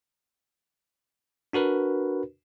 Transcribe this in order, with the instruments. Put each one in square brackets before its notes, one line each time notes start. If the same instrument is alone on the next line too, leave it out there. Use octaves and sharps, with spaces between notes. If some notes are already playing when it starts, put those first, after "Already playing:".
[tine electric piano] D4 F#4 A#4 B4